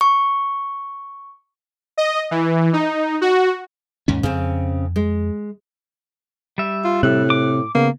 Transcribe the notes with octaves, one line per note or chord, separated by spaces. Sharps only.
C#6
D#5
E3
D#4
F#4
D#2 G#2 C#4
F2 C#3 C4
G#3
G3 E5
F4
A2 C3 F#6
D6
C#3 A#3 B3